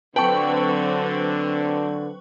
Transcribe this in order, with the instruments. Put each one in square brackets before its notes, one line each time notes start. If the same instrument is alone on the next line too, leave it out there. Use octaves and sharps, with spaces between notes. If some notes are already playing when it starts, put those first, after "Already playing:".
[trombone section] D3 D4 [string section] F#3 C4 [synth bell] B4 C#6 [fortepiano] G5 A5